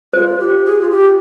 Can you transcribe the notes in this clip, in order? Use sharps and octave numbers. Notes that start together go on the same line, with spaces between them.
F4 C5
G4
G#4
F4
G4